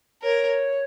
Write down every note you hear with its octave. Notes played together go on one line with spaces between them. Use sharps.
A#4 C#5